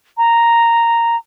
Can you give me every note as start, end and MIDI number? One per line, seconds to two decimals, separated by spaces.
0.17 1.16 82